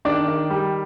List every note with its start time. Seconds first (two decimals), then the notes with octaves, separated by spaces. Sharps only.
0.05 D#3 D4 D5
0.28 D#3
0.50 G3